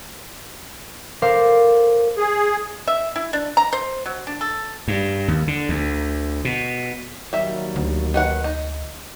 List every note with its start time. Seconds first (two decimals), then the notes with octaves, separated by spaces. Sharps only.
1.22 A4 A#4 C5 F5 D6
2.18 G#4
2.88 E5
3.16 E4
3.33 D4
3.57 A#5
3.73 C5
4.06 F#3
4.27 D4
4.41 A4
4.88 G2
5.28 D#2
5.48 D3
5.69 D2
6.45 B2
7.33 D#2 F#3 G3 E5
7.76 D2
8.14 D#3 B4 F#5
8.44 D#4